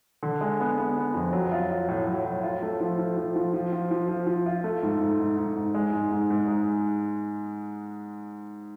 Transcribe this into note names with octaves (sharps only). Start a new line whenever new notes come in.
D3
G#3
B3
B3
B3
F2
F#3
F4
F4
A2
F#3
A2
F4
A3
F3
F3
F3
F3
F3
F3
F3
F3
F3
F4
A3
G#2
G#2
G#2
G#2
G#2
G#3
G#2
G#2
G#2
G#3